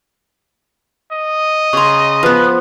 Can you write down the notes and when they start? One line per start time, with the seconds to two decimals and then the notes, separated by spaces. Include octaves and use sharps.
1.12 D#5
1.73 C#3 A#5 C6 C#6
2.23 F3 B3 B4